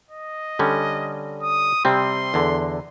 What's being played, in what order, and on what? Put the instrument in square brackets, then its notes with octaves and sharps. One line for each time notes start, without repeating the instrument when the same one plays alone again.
[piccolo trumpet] D#5
[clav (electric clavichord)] D3 G3 C#4
[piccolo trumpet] D#6
[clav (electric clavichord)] C3 G3 C4 [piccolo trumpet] C6
[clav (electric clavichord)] E2 D3